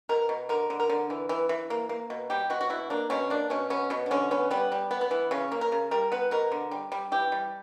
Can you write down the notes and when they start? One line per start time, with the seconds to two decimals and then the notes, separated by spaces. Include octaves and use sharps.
0.09 B2 A#4
0.29 B2
0.49 D3 A#4
0.70 D3
0.80 A#4
0.90 D3
1.10 E3
1.29 E3
1.49 E3
1.70 A#3
1.89 A#3
2.10 B2
2.30 G3 G4
2.50 B2 F#4
2.61 F#4
2.70 B2 E4
2.90 A#3 D4
3.10 B2 C#4
3.30 A#3 D4
3.50 B2 C#4
3.70 B3 C#4
3.90 B2 B3
4.06 D4
4.11 D3 C#4
4.31 B3 C#4
4.51 G3 B3
4.72 G3
4.91 B3
5.01 B3
5.11 E3
5.31 C#3 C#4
5.52 A#3
5.61 A#4
5.72 C#3
5.91 G3 A#4
6.12 B3 B4
6.31 B2 A#4
6.52 D3
6.71 G3
6.92 G3
7.12 E3 G4
7.32 G3